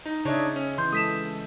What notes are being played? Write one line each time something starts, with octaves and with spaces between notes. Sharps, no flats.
D#4
C#3 D4 D#4 C#5 D#5 E5
C#4
E3 C6 G6
G#3 A4 D#6 B6 E7